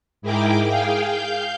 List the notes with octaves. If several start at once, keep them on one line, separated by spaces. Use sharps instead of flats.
G#2 E4 G#4 A#4 G5 D6
G#4 F5 G5
F5 G6